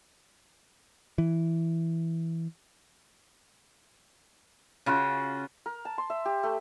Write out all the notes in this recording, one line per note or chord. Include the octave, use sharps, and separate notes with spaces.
E3
C#3 F4 F#4
A#4
A5
C6
E5
G4
A3